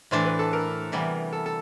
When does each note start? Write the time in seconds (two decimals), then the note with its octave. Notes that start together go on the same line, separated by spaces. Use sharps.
0.11 A2 E3 A3 D4 C5
0.25 B4
0.39 A4
0.53 A#4
0.92 C3 E3 G3 B3
1.33 A4
1.46 A4